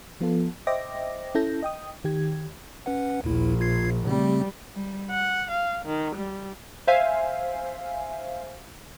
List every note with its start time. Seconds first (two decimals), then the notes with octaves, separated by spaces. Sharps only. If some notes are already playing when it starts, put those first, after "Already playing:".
0.21 F3 B3 F4 A4
0.67 C5 D#5 E5 G5 D6 A#6
1.35 C#4 E4 A4 G6 A#6
1.63 D#5 G5 D#6
2.04 D#3 G4 G#6
2.86 C#4 B4 F#5
3.24 A#1 D#2 E4
3.60 F4 G#6 C7
4.07 C#3 G3 A3 C4
4.75 G3
5.10 F#5
5.50 F5
5.84 D#3
6.14 G3
6.87 C5 E5 F5 G#5